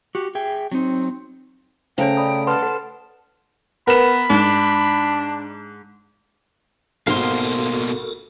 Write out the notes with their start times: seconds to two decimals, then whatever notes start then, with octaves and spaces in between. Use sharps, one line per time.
0.15 F#4 G4
0.35 G#4 E5 G5
0.72 F#3 C4 D#4
1.98 C#3 A3 C5 C#5 G5 A#5
2.17 D5 B5 D#6
2.47 B4 F#5 A5 C6 F6
2.62 A4 B4 F#5
3.87 B3 A#4 B4 B5 E7
4.30 G#2 D4
7.07 G#1 B2 A#3 F#4 A4 A#4 F5 C6